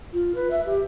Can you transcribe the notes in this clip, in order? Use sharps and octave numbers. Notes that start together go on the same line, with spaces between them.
F4
B4
E5
G4